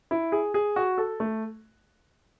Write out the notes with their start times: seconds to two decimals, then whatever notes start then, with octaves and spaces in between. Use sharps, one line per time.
0.11 E4
0.32 G#4
0.54 G#4
0.76 F#4
0.98 A4
1.20 A3